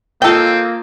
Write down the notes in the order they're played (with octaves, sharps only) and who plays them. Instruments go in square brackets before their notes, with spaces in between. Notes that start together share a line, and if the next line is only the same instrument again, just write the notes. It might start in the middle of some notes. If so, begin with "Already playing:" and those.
[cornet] A#3 [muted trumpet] C4 [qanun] F4 D#5 [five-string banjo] A4 G5